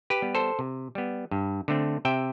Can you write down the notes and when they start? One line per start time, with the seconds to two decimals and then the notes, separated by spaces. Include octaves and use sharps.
0.10 G4 B4
0.22 G3 B3
0.35 A4 C5
0.59 C3
0.95 G3 B3
1.31 G2
1.68 D3 A3 C4
2.05 C3 E5 G5